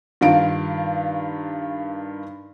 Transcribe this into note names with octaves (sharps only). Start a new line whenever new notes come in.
G2 D#3 F4 F5 D7